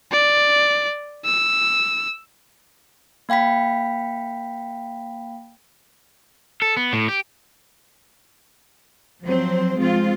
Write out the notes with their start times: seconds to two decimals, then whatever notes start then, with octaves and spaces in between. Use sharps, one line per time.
0.12 D5
1.25 E6
3.29 A#3 F5 G5 B5 B6
6.62 A4
6.77 B3
6.93 A2
7.08 G4
9.23 F3 F#3 C4 C5
9.79 F3 G#3 C4 F4